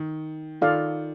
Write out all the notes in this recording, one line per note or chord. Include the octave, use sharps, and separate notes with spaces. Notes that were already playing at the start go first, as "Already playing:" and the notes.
Already playing: D#3
D#3 F4 A4 D5 F5